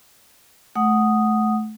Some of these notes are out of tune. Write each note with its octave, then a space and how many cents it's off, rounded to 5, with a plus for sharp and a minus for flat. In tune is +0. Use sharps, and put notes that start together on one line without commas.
A3 -25 F#5 +0 D#6 +0